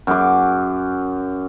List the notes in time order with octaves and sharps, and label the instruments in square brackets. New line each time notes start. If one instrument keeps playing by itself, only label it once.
[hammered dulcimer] F#2 D6